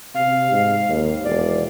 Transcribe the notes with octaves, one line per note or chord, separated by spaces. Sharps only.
C3 F5
G#2
D#2
E1 D5